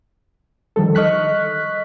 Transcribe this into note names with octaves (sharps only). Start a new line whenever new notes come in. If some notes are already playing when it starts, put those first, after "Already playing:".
D3 D#3 F3 G3 A4
D#5 C#6 F6 F#6 B6